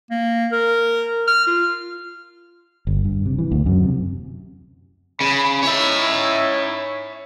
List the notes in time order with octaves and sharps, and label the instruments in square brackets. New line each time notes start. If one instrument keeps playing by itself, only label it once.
[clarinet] A#3
A#4
F6
F4
[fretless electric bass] G1
G2
C3
E3
D2
F#2
C3
[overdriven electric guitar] C#3 [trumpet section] B5
[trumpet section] C#4 D#4 E4 [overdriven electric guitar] C#5 E5